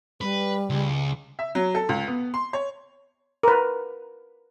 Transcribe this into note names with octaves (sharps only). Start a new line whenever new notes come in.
G3 B4
C#2
E5
F#3
A4
C#2
B3
C6
C#5
A#4 B4